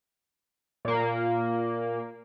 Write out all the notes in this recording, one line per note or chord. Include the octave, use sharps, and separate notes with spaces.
A#2 A#3